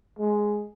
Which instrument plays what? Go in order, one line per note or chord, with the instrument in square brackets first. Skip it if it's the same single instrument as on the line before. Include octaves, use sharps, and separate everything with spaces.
[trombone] G#3